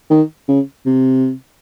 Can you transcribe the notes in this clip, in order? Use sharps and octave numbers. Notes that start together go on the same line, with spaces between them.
D#3
C#3
C3